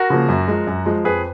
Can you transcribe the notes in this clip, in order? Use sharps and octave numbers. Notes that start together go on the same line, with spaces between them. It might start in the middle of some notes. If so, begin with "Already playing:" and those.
Already playing: F#4 A#4
C#3 F3 A#3
F#2
F3 G#3
F#2
F3 G#3
F2 G#4 B4